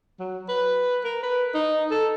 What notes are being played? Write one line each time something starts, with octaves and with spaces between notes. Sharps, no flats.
F#3
B4
A#4
B4
D#4
A4